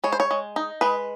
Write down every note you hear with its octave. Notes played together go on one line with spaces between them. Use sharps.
G#3 C#5
C5
C#5
G#3
D#4
G#3 B4